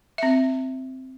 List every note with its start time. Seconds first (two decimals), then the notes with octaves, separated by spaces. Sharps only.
0.18 C4 E5